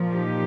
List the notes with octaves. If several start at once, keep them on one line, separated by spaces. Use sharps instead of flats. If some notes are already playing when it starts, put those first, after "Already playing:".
Already playing: A#2 F3
D#4 G4